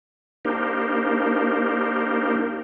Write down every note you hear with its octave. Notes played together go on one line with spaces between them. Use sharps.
A#3 D4 D#4 G4 A#4 C5